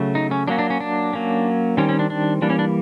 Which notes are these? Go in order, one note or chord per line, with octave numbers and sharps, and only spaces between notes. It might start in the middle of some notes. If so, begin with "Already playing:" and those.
Already playing: C#3 F#3 A3
D#4
C#4
F#3 A#3 C#4 D4
D4
C#4
D4
F#3 A#3 C#4
D#3 G3 C4 C#4
C#4
D4
D4
E3 G3 A#3 D4
C#4
D4